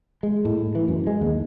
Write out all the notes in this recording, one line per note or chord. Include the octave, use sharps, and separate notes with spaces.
G#3
A2
E3
F#2
G#3
D#2